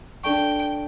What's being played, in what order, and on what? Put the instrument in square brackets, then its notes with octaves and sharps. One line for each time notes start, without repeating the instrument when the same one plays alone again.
[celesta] D4 A4 D5 A5 C#6 [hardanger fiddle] G5